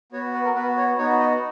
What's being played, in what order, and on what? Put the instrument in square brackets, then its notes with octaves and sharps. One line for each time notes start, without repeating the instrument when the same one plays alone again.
[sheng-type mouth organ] B3 F#4 C#5
B4
A#4
B3 F#4 B4
C#5
B3 D#4 F#4 C#5
D#5